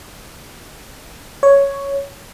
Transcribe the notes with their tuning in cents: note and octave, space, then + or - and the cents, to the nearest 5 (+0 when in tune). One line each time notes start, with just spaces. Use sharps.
C#5 +5